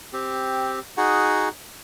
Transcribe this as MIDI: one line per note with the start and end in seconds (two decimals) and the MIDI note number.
0.13 0.79 60
0.13 0.79 67
0.97 1.49 63
0.97 1.49 66
0.97 1.49 68
0.97 1.49 78